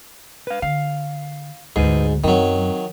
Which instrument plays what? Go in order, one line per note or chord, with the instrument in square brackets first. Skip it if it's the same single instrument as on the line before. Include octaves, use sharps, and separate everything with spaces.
[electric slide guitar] B4 F5
[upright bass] D3 [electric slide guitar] F5
[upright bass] D2 G#3 [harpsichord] G#2 [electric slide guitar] G#4 B4
[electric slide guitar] F#2 [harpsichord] D#3 F#3 [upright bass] C4